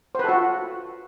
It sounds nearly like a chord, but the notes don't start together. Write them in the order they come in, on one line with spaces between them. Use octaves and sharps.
C5 B4 A4 F#4 F4